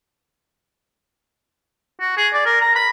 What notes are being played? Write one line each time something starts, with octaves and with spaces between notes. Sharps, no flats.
F#4
G#4
D5
A#4
A#5
B5